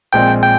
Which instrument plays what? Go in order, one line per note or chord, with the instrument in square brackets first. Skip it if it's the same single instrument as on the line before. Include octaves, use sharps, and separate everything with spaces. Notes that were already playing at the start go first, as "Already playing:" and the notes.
[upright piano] A#1 A#2 G#3 C4 [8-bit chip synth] G5
[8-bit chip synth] G5